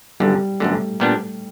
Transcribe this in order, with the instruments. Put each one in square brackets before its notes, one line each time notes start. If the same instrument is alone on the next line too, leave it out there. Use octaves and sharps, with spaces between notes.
[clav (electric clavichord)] G1 F#2 D3 [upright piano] G3
[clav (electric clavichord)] G1 F#2 D3 [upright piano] A3
[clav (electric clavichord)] A#2 G3 B3 D4